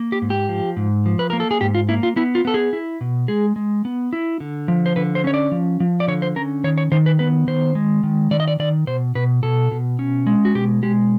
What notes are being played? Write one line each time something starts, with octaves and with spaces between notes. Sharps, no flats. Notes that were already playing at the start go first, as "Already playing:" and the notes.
Already playing: A#3
G4
G#2
G4
F3
G#2
F3
B4
A#3 A#4
A4
G#4
G#2 G4
F4
A#3 E4
F4
B3 E4
F4
B3 A4
G#4
E4
B2
G#3 G#4
G#3
B3
E4
D3
F3
C5
D3 B4
C5
C#4 C#5
D5
F3
F3
D5
D3 C#5
C5
C#4 A#4
D#3 C#5
C#5
D#3 C5
B4
B3 B4
D#3 C5
G#3
D#3
D#3 D5
D#5
D5
D#3 D5
B2 C5
B2 B4
B2 A4
B2
C#4
G#3
F#4
B2 G4
G#3 G4